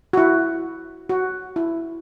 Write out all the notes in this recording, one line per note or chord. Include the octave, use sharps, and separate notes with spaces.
F#4
E4
F#4
E4